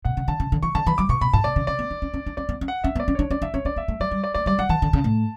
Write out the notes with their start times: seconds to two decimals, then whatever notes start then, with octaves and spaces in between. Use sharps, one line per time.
0.05 B2 F#5
0.17 C#3
0.28 D3 A5
0.40 C#3
0.52 D3
0.63 E3 C#6
0.75 D3 A5
0.86 E3 B5
0.98 F#3 D6
1.09 B2 C#6
1.21 B2 B5
1.33 A2 A5
1.44 B2 D5
1.56 C#3
1.67 C#3 D5
1.79 B3
1.91 D4
2.02 C#4
2.14 C#4
2.26 D4
2.37 C#4 D5
2.49 B3
2.61 C#4
2.68 F#5
2.84 C#4 E5
2.96 B3
3.00 D5
3.08 C#4
3.15 D4 C#5
3.30 C#4 D5
3.42 D4 E5
3.54 C#4 C#5
3.65 C#4 D5
3.76 B3 E5
3.88 A3
4.00 F#3 D5
4.11 G3
4.24 D5
4.34 A3 D5
4.46 G3 D5
4.59 F#3 F#5
4.69 E3 A5
4.82 D3
4.93 C#3
5.04 A2